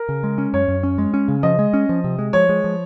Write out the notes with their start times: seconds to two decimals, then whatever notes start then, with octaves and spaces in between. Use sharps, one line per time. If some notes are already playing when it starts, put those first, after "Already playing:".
Already playing: A#4
0.09 C#3
0.23 G#3
0.38 C#4
0.53 F#2 C#5
0.68 F#2
0.83 C#4
0.98 G#3
1.14 C#4
1.28 C#3
1.43 F3 D#5
1.59 G#3
1.74 C#4
1.89 F3
2.04 C3
2.19 G#3
2.33 F3 C#5
2.49 G#3
2.64 F3